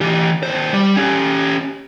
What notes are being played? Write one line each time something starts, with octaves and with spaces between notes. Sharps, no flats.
E3 G4
D#2 C5
G3
C#4 G4